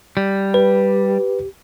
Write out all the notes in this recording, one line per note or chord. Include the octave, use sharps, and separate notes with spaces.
G3
G4 B4